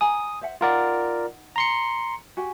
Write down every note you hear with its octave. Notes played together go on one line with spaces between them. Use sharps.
G#5 A#5 D#6
C5 E5 F#5
D#4 F4 A#4 D5 F#5
A#5 C6 C#7
F#4 G4 G#5